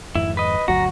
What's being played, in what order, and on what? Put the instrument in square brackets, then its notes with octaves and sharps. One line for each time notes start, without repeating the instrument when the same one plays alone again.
[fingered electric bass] F2 G#2 D#3 [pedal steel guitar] E4
[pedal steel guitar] B4 D#5
[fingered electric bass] G1 D2 F#3 [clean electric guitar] F#4 [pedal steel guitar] A#5